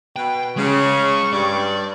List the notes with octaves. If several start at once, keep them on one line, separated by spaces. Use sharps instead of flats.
B2 B4 G5
C#3 G#3 C#5 C#6
G2 D5